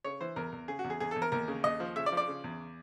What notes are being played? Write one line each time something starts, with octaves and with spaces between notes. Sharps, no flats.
C#3 C#5
E3 C5
E2 A#4
E2
C#3 G#4
F#4
E2
G#4
E2 G#4
A4
E2
A#4
D#2 A#4
C#3
D#2 D#5
F3
C#3 E5
D5
F3
D5
C#3
E2